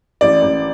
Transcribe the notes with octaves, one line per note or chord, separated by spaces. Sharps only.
A1 D5
A1